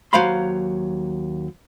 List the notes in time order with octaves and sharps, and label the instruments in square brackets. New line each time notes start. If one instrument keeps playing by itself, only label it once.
[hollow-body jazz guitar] D#2 F#3 C5 F5 B5 C6